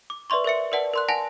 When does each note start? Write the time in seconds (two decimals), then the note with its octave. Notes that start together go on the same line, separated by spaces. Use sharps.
0.10 D6
0.30 B4 D5 E5 C6 C#6
0.44 A#4 C5 E5 C#7
0.72 A#4 B4 D5 F#5 A5
0.94 A#4 C6 F#6
1.09 F#5 G#5 A5 A#6 F7